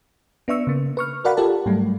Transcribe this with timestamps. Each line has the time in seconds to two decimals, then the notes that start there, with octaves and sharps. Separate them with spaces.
0.48 B3 D4 E5 C#6 E6
0.67 C#3 A#3
0.97 B4 C#6 F6
1.25 F#4 A#4 D5 F5 F#5 B5
1.37 F4 G4 A4 A#4 D5 A5
1.66 G#2 F#3 G3 A3